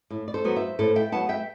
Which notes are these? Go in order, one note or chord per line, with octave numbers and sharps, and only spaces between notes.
A2
D5
A4 C5
F#3 B3
C5 E5
A2 A4 C5
E5 G5
F#3 B3 F#5 A5
E5 G5